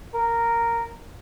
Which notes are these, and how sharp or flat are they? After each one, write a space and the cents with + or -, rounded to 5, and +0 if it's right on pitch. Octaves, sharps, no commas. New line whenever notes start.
A#4 -5